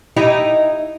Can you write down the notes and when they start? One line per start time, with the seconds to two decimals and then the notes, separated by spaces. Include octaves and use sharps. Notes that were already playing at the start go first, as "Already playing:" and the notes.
0.17 D#4 E4 G4